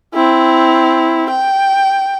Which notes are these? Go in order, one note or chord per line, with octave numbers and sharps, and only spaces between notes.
C4 E4
G5